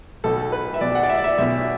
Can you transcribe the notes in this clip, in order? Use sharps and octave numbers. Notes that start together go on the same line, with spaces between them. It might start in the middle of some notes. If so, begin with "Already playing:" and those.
B1 B2 A4
B4
E5
B1 B2 D5
F#5
D5
E5
D5
E5
B1 B2 E5